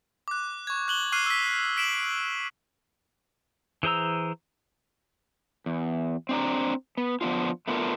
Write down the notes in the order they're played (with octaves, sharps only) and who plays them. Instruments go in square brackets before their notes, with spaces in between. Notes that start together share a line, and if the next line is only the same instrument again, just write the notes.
[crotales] D6 F#6
C#6 G#6
F#6 F#7 G7
C#6 D6 F6 F#6 C7 D#7
E6 B6
B6 D7 E7 F#7
[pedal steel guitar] E3 G#4 C5 A#5 E6
[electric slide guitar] E2
C4 D4 A#5
B3
F3 B3 D4 F4
A3 B3 D4 F4 G4 A#4